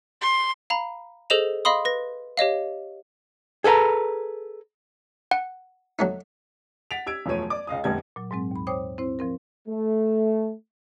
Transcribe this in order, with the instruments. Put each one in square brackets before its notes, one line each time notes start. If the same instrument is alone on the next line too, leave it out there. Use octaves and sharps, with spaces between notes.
[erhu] C6
[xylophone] F5 A#5 B5
G#4 A4 C5 D#5 E7 F7
D#5 F5 B5 C6 D#6
B4 A#6
G4 C#5 D#5 F5
[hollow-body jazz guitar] G#4 A4 B4 F5 A#5
[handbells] F#5
[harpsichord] F#3 A3 D#4
[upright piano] F#5 A6 B6 D7 F7
G4 E6 G#6 D7
E1 F#2 F3 A3 C#5 D#7
D5 D6
C#2 D#5 F5 D#6
F1 A#1 D3 G3 G#6
[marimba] A#2 F#3
G#2 F#3 G#3 C4
D#2 B5
C5 C#5 G5 D6 D#6
C4 E4 C5
F3 C4 A#4
[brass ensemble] A3